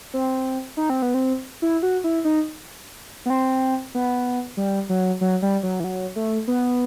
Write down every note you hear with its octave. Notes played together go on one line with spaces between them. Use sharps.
C4
D#4
C4
B3
C4
E4
F#4
E4
D#4
B3
C4
B3
G3
F#3
F#3
G3
F#3
E3
F#3
A3
B3